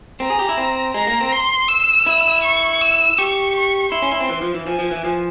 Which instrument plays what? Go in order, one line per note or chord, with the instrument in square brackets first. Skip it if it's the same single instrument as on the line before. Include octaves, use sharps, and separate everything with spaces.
[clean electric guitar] C4 [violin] A#5
[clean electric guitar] G#4
G4
E4
C4
[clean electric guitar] G#3 [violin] A#5
[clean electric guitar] A#3
C4
[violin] C6
E6
[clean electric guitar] E4
[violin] C#6
E6
[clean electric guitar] G4 [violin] C#6
[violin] C#6
[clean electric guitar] E4 [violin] C6
[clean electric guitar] C#4
E4
C4
E3
F3
E3
[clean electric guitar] F3 [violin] G#5
[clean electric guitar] F3
E3
F3